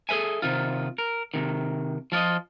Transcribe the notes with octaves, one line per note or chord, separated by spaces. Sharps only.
G#4 A4 B4 E5 G#5
C3 D#3 F4
A#4
C3 D#3
F3 F4 D5 D#5